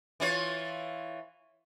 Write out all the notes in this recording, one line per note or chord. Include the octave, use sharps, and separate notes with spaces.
E3 F4 C#5